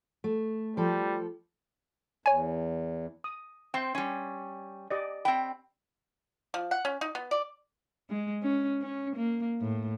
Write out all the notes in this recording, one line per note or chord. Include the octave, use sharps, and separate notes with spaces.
A3
F3 G3 A4
E2 C#5 G#5
D#6
C4 G5 C6
G3 C#4
G4 D5 D#5
C4 G5 B5
F3
F#5
C#4
D#4
B3
D5
G#3
C#4
C#4
A#3
A2